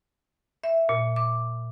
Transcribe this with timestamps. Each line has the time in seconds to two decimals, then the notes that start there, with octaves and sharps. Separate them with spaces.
0.64 E5
0.89 A#2
1.16 D6